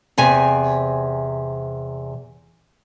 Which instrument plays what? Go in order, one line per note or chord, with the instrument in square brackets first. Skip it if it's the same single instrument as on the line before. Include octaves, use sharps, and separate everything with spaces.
[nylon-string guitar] E2 C3 G#5